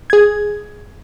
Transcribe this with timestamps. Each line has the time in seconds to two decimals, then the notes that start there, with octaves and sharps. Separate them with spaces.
0.10 G#4 G#6